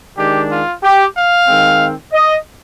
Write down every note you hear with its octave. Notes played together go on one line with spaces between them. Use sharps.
D#3 G#3 D4 G4
F4
G4
F5
D#3 G#3 C4
D#5